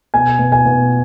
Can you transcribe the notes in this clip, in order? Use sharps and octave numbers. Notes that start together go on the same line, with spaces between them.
B2 G#5
B2
G#5
B2